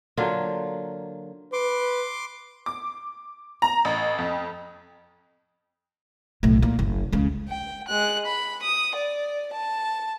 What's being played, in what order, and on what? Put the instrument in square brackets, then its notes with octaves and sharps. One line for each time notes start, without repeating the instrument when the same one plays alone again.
[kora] D3 F#3 A#3 F4
[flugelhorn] B4 [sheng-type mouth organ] C6 D6
[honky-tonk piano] D6
A#5
A1
F2
[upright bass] B1 A2
A#2
F#1
C#2 C#3
[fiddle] G5
G#3 F#6
B5
D#6
D5
A5